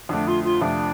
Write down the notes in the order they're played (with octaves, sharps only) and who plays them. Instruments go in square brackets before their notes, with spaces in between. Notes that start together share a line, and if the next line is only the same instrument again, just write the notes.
[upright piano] F2 D3 A3 [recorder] D4
[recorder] F4
F4
[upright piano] F2 C3 A3 F4 [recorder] D4